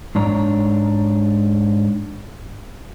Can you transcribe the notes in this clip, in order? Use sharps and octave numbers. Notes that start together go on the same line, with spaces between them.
G#2 D4 C#5 A#5